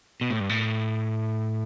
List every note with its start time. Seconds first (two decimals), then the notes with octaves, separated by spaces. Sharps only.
0.21 B2
0.31 A2
0.40 G2
0.49 A2